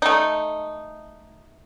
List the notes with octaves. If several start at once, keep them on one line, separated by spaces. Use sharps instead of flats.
A3 D#4